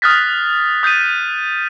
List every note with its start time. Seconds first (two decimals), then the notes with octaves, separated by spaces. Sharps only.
0.02 D#6 F6 F#6 A6 B6
0.83 D#6 G6 A6 B6 D#7